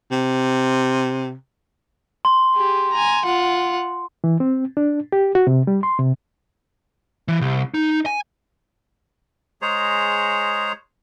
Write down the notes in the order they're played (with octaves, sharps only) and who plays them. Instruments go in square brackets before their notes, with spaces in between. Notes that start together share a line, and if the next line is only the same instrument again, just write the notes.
[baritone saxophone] C3
[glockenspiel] C6
[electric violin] G4 G#4
G#5 A#5
F4 F#5
[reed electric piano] E3
C4
D4
G4
F#4
C3
G3
C6
C3
[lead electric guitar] E3
C2
D#4
G#5
[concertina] G#3 G#4 C5 C#5 A#5